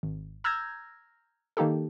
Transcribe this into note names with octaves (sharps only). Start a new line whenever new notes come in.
G#1
A#5 E6 F6 G6 G#6 A#6
D#3 A#3 D#4 G4 A4